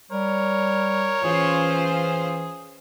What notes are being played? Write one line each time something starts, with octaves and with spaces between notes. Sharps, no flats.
G3 A#4 C#5
E3 C#4 F4 G#4 C5